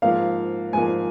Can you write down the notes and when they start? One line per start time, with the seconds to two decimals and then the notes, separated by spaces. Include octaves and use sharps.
0.02 G#2 F3 A#3 F5
0.73 G#2 F3 A#3 G#5